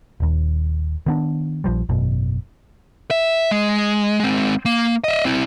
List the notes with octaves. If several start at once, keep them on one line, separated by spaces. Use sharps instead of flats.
D#1 D#2
D#3 B3 D4
A#1 F3 G3
G#1 F#2 B2
E5
G#3
G#3 C4
A#3
D#5 E5
C4 E4